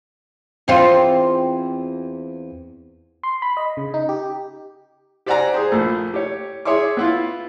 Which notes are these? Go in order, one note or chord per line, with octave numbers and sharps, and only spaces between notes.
E2 C4 F4
C6
B5
D#5
C#3
D#4
G4
G4 C5 D5 F#5 G#5 A#5
G#4 C5
A#1 A3
G4 C#5
G#4 C#5 E5 C6 D6
B3 E4 F4